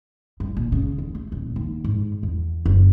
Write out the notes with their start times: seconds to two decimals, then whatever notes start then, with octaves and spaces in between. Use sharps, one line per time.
0.40 G2
0.57 A#2
0.72 C#3
0.98 D#2
1.15 A3
1.32 D#1
1.56 D#2
1.84 G#2
2.23 E2
2.66 F#1